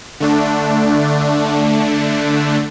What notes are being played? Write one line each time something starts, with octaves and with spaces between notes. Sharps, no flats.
D3 A3 D4